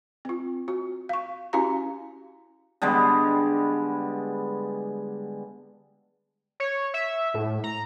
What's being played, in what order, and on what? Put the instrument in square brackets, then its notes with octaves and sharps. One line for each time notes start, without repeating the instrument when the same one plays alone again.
[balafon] C4 F4
F#4
F5 C#6
C#4 E4 F#4 G4 F5 A#5
[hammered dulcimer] D3 G3 G#3 B3
[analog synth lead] C#5
E5
A2
A#5